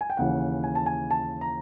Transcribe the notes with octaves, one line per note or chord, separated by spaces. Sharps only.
G#5
G5
D#2 C#3 E3 F#5
G#5
A5
G#5
A5
A#5